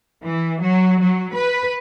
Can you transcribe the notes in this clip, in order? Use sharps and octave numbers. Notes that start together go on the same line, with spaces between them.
E3
F#3
F#3
B4